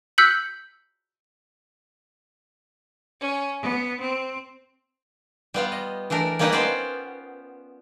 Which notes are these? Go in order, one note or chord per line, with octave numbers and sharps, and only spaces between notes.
E6 F#6 G6 B6 C#7 F#7
C#4
B3
C4
G3 B3 F4
D#5
E3 A3 D4 A#4
G3 A#3 C#4 D#4 B4 D#5
B3 C#4 F4 C5 D5 G5